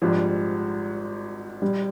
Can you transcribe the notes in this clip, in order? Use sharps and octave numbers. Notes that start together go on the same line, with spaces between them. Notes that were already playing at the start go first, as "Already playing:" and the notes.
G#1 G#2 F3 G3 D4
G3